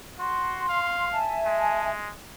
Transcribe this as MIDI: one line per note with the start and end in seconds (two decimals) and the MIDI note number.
0.19 0.68 66
0.19 1.07 84
0.69 1.18 77
1.13 1.89 76
1.13 1.89 80
1.13 1.89 81
1.45 2.11 56